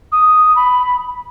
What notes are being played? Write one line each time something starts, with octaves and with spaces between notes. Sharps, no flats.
D#6
B5